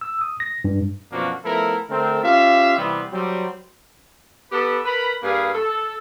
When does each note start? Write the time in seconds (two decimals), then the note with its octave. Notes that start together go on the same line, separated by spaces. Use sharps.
0.01 E6
0.21 D#6
0.40 A#6
0.64 G2
1.11 F#2 B2 F3 A#3 D4 F#4
1.44 F3 A3 B3 E4 A4 A#4
1.89 D3 A3 C4 A4 A#4
2.23 C#4 F4 G4 E5 F5
2.77 C3 E3 G3 B3 C4
3.13 F#3 G3 C4
4.52 B3 G4 A4 B4
4.85 A#4 B4 B5
5.22 G2 A#3 G#4 B4 F5
5.54 A4